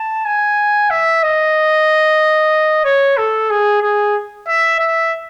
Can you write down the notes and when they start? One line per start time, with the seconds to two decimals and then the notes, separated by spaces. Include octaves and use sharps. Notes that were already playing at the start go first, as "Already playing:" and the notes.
Already playing: A5
0.25 G#5
0.90 E5
1.23 D#5
2.84 C#5
3.17 A4
3.50 G#4
3.82 G#4
4.47 E5
4.79 E5